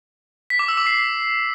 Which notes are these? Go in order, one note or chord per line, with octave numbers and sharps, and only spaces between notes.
B6
D6
E6
D6
C7